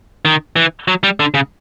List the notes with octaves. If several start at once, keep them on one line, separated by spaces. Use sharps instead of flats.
D#3
E3
F#3
G3
D3
C#3